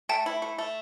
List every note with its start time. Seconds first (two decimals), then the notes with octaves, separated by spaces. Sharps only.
0.09 A3 G5 A5
0.26 E4
0.42 A3
0.59 A3